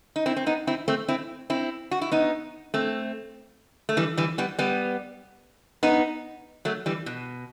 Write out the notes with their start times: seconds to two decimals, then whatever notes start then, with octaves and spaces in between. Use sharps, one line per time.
0.16 D#4
0.26 C4 E4
0.36 C4
0.46 B3 D#4
0.67 C4 E4
0.88 A3 C4
1.08 C4 E4
1.50 C4 E4
1.91 F#4
2.01 E4
2.12 B3 D#4
2.74 A3 C4
3.89 A3
3.97 E3 G3
4.17 E3 G3
4.38 G3 B3
4.58 G3 B3
5.83 B3 D#4
6.65 F#3 A3
6.86 E3 G3
7.06 B2